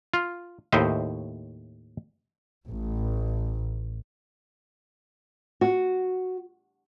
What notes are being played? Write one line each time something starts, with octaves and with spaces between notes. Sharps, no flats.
F4
D#2 A2 C5 D#5 E5
A1
F#4